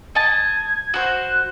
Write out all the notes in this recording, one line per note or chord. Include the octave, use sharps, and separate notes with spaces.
D#5 A5 G#6
F#4 C5 F#6